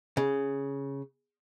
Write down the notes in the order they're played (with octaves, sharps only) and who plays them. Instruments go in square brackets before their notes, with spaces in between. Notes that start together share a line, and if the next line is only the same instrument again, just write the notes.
[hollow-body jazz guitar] C#3